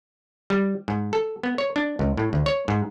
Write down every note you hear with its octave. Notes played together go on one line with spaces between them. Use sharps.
G3
G#2
A4
B3
C#5
D4
C#2
A2
D2
C#5
G#2